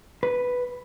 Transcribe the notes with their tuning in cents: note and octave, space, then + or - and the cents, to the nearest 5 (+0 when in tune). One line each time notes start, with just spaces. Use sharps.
B4 +0